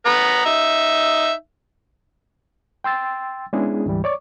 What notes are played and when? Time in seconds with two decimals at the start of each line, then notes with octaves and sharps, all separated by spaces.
0.06 B3 B4 A#5
0.46 D#4 E5
2.84 G5 C6 E6 A6
3.53 G#3 B3 C#4 D4 E4 G#4
3.86 D2 G#2 E3 G3
4.04 C#5 D5 C#6 D6